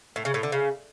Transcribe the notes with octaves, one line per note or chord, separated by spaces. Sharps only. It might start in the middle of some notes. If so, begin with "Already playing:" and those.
A2
C#3
A2
D3
C#3